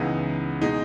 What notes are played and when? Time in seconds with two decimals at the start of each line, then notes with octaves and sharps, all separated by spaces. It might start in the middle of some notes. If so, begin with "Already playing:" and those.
Already playing: C#2 C#3 E3 B3 D#4
0.61 B2 G#3 D#4